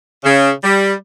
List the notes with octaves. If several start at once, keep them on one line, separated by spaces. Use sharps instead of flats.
C#3
G3